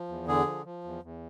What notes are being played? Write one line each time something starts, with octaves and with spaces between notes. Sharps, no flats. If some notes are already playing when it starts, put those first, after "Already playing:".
Already playing: F3
E2
D3 G#4
F3
F3
E2
E2